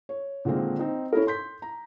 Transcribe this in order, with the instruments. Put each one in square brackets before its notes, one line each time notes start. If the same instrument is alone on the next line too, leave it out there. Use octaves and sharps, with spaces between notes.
[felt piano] C#5
A#2 D3 D#3 G#3 A#3 C4
C4 D#4
C#4 E4 A4 A#4
C6 G6 B6
A#5